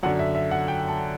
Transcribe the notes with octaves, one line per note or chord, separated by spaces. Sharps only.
F#2 D3 F#5
E5
E5
F#5
G5
A5